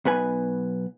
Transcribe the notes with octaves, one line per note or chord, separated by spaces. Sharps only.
B1 B3 B4 G#5